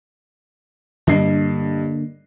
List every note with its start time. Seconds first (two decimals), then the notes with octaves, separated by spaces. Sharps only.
1.07 G2 D3 A#3 D#5 C7